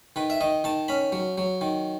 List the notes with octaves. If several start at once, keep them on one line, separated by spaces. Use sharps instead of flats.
D#3 B4
E5
D#3 D#5
D#3 A5
C#4 B5
F#3
F#3
D#3